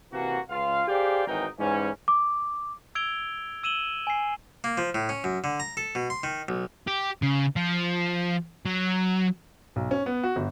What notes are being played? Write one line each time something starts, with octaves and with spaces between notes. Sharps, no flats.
C3 E3 A#3 F#4
C#2 F4 F5
G4 G#4 C5 D5 F5 G5
G#1 E3 F#3 D#4 A#4 G5
G#2 E3 G3 C#4
D6
E6 G#6 D7 F7 G7
E6 D#7 E7 F#7 G7
G#5 C7
A#3
F3
A2
C#4
F#2
D3
A#5
A4
B2
C6
D#3
B1
G4
C#3
F3
F#3
B1
C#4
B3
F#4
G1